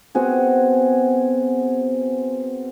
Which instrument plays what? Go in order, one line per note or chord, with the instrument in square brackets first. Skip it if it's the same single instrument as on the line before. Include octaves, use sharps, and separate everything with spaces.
[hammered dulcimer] B3 C4 F#4 G#4